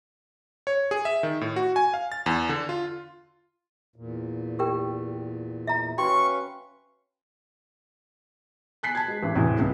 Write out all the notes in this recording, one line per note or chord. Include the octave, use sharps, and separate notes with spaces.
C#5
G#4
E5
D#3
A2
F#4
G#5
F5
A6
E2
D3
F4
E2 A#2
G4 A#4 G5
E5 A#5
C#4 F#4 B4 F5 G5 C6 C#6
G#5 F#6 B6 C7
A5 G#6
G#3
A1
E2 A2 C3
C#2